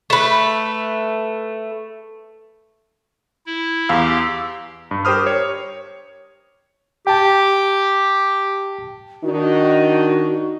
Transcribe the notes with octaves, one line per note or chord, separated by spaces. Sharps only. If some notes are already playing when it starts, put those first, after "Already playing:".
A3 B4
E4
E2 G4 F5 E6
G2
G4 A#4 C5 D#6 F6
C#5
G4 G5 A5
D#3 D4 D#4 F#4